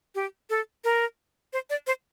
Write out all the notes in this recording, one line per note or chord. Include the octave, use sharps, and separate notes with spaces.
G4
A4
A#4
C5
D5
C5